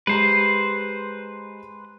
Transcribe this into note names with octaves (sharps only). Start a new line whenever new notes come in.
G#3 G4 B4 C5 A#5